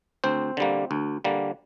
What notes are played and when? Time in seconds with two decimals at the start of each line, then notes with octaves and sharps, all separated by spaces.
0.24 D2 C4 C5
0.57 D3 G3 A#3
0.91 D2
1.24 D3 G3 A#3